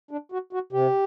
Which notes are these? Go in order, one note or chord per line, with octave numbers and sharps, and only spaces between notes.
D4
F#4
F#4
C3 G4